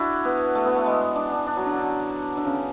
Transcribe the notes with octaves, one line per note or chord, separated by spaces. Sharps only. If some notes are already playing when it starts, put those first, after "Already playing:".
Already playing: D4 E4 F#4
B3
A3
B3
A3
G#3
D4
D4
D4
F#3
D3
D3
D3
C#3